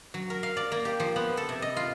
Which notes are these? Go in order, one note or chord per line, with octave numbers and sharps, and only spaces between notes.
F#3
A#4
F5
D5
A#3
G4
F3
B3
A4
C3
D#5
F4